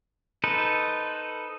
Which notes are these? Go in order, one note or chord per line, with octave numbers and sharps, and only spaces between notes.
D#4 A4 B4 C5